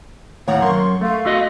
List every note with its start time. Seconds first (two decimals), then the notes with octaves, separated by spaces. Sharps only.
0.48 D#2 A2 C#5 F5 F#5 A#5
0.62 F#2 A#4 C6 C#6
1.01 A3 F5
1.25 A3 F#4 D#5